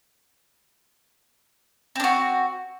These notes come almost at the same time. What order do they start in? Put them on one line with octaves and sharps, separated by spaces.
C4 D4 F#4